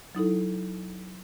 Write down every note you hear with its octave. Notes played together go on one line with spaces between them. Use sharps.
F#3 D#4 E4 A4